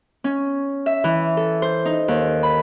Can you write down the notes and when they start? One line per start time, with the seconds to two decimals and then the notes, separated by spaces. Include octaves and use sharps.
0.24 C#4
0.86 E5
1.04 E3
1.37 A4
1.62 C5
1.85 D#4
2.08 D#2
2.43 B5